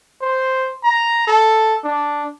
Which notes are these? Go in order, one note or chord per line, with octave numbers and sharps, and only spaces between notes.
C5
A#5
A4
D4